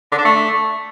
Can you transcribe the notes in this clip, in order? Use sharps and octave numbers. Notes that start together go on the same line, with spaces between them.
D3
D4
A3